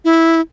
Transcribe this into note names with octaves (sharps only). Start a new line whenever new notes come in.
E4